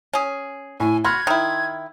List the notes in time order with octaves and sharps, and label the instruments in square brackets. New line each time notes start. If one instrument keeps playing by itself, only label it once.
[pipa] C#4 G#4
[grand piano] A2 [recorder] G#5
[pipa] F#4 [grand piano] B5 C6 F6 [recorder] G#6
[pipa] D#3 E4